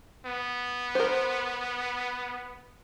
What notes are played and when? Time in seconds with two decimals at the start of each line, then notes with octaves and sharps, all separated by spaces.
0.25 B3
0.95 A#4 C5